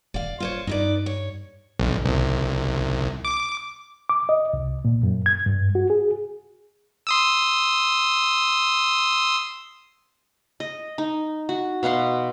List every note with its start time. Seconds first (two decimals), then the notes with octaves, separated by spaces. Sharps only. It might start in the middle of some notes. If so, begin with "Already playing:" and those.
0.14 E1 D5 F5
0.40 F4 C5 C#5
0.67 G2 D#4 B4 D5
1.06 C#5
1.79 B1
2.05 C2
3.25 D6
4.09 D6
4.29 D#5
4.54 C2
4.85 A#2
5.03 F#2
5.26 G#6
5.46 G2
5.75 F#4
5.90 G#4
7.07 C6 D#6 E6
10.60 D#5
10.98 D#4
11.49 F#4
11.83 B2 F5 F#5 C6